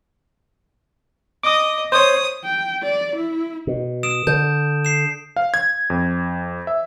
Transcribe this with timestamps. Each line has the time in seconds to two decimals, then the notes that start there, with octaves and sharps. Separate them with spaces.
1.43 D#5 D6 D#6
1.92 C5 C#5 D#6
2.44 G5
2.83 D5
3.15 E4
3.67 B2
4.03 D#6 D7 E7
4.27 D3 A5 G6
4.85 C7 E7
5.36 F5
5.54 G#6
5.90 F2
6.67 E5